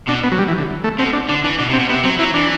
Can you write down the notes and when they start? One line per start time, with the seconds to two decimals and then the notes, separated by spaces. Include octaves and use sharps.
0.08 B2 D4
0.24 B3
0.32 F#3
0.39 G3
0.48 E3
0.58 D3
0.84 A3
0.99 B2 C4
1.13 D4
1.29 D3 D4
1.44 E3 D4
1.59 B2 D4
1.70 C3
1.73 C4
1.79 B2
1.89 C3 B3
2.03 F#3 C4
2.19 F#3 E4
2.34 E3 D4